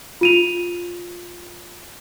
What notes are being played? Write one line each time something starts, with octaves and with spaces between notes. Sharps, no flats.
F4 D#7 F7